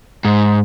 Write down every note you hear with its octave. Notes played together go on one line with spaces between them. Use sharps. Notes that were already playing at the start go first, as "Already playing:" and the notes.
G#2